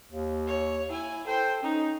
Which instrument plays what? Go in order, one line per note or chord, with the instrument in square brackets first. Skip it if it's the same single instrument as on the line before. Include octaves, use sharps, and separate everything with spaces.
[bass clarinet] D#2
[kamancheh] C#5
E4 G#5
[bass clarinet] A4 [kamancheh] C5 G5
[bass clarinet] C#4 [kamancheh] D#4